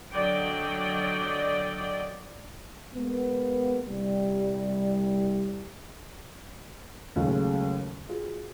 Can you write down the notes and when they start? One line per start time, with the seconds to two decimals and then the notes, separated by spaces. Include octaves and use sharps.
0.13 D3 F#3 D5 D#5 G5
2.95 G#3 A#3 B3
3.87 C2 G3
7.16 D#2 C#3 F#3 G#3 A3
8.08 F4 F#4 G#4